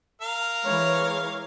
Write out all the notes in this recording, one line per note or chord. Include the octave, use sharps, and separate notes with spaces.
A#4 F5
E3 G#3 C#5